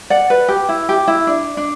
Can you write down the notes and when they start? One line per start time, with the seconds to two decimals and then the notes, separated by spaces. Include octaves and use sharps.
0.10 D5 F#5
0.30 B4
0.48 G4
0.69 E4
0.89 G4
1.08 E4
1.27 D4
1.57 D4